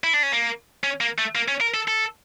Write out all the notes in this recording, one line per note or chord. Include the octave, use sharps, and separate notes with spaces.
E4
D4
C#4
A#3
C#4
A#3
A3
A#3
C#4
A#4
A4
A4